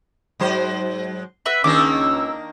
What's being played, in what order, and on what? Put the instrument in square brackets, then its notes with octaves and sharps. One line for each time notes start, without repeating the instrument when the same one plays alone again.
[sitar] G#2 F#3 C5
[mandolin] F#4 B4 E5
[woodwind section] C#2 C#4 E6 [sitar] D#3 A#3 D4 [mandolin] D6